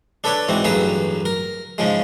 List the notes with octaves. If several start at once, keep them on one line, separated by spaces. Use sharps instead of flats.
D4 A4 B4 C#5 D5
G#2 E3 C4 F#4
A1 G2 F#3 G#4 B4 C#5
A#4
G#2 C#3 F3 G#3